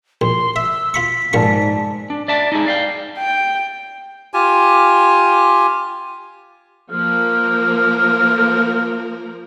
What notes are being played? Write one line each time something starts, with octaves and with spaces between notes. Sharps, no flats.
A#1 C6
E5 E6
F4 B5 C#6 B6
A#1 G#2 D#4 D5 F5 A5 C#6
D4
D5 E5 A5
D#4 E4 G#4
D5 F5 G5
G5
F4 G4 G#5
F3 A#3 A#4 F5